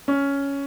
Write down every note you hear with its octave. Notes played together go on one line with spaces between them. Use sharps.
C#4